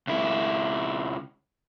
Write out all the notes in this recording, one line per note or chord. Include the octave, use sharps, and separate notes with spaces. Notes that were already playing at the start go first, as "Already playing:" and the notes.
C#2 E4